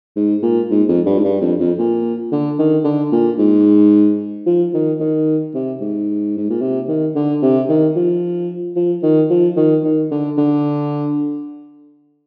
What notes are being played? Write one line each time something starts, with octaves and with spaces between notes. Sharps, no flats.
G#2
A#2
G#2
F2
G2
G#2
G2
F2
F2
A#2
D3
D#3
D3
A#2
G#2
F3
D#3
D#3
C3
G#2
G#2
A#2
C3
D#3
D3
C3
D#3
F3
F3
D#3
F3
D#3
D#3
D3
D3